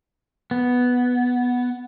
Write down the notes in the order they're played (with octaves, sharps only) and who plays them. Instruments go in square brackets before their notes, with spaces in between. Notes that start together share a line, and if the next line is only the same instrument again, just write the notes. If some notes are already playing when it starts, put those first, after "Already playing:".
[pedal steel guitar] B3